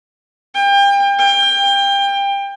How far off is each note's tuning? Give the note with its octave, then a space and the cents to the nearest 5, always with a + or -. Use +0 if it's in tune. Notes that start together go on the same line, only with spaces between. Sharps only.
G5 +35
G5 +25